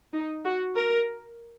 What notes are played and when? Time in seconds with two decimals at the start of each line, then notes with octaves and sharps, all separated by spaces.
0.13 D#4
0.44 F#4
0.75 A#4